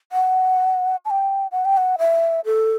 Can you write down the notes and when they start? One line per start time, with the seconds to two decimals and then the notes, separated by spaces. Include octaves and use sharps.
0.12 F#5
1.05 A5
1.10 G5
1.52 F#5
1.65 G5
1.77 F#5
1.98 E5
2.45 A4